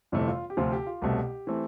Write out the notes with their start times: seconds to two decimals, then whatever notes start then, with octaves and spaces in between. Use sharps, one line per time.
0.12 G1 F2 C3 E3 A3
0.28 F4
0.50 G4
0.57 D2 C3 F3 C4 F4
0.72 G4
0.87 F4
1.02 C2 B2 A3 C4 G4
1.47 E3 A3 C4